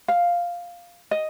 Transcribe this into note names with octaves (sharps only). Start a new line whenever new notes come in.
F5
D#5